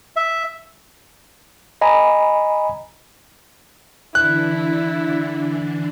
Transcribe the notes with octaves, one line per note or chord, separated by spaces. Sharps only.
E5
D#5 G#5 A#5 B5
D3 E3 D4 E4 F#6